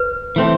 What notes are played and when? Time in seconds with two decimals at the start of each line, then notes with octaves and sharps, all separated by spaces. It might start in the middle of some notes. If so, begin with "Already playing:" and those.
Already playing: B4
0.36 E3 A3 C4